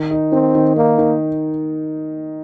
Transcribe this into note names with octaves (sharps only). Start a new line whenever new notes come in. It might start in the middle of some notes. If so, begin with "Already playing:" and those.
Already playing: D#3
D#4
D#3 C4
D#3
A#3 D#4
D#3